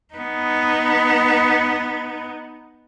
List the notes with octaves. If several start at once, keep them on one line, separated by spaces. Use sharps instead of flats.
B3 D#4